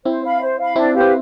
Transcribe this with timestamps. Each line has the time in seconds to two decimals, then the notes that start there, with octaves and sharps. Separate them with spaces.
0.05 C4 E4 C5
0.24 F5 B5
0.41 C5
0.59 F5 B5
0.76 C4 D4 E4
0.94 G4 B4 F5
1.01 C4